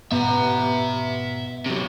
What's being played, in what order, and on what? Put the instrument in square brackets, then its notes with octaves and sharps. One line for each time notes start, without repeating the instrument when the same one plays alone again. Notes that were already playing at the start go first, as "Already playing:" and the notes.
[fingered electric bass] G#2 B2 [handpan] B3 [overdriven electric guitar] E5 A#5
[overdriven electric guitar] C3 F#3